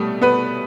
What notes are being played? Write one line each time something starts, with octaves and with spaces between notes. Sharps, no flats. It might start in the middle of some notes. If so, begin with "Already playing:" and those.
Already playing: B2 G3 A3
B3 B4